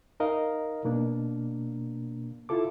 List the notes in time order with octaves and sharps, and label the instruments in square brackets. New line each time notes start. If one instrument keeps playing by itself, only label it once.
[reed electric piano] D#4 A#4 D#5 F5
B2 A#3 D4
E4 F4 A4 D6